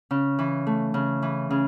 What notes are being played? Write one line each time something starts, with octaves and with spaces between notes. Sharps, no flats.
C#3
E3
A3
C#3
E3
C#3